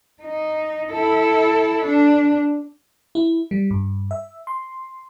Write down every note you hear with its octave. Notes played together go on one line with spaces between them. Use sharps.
D#4
E4 A4
D4
E4
G3
G2
E5
C6